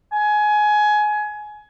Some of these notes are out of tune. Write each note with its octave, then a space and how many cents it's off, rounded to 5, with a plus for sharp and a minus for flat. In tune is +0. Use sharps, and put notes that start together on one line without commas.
G#5 +20